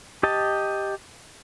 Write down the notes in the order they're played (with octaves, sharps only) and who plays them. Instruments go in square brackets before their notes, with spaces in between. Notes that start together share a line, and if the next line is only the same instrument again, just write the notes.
[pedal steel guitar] G4 D#5 A5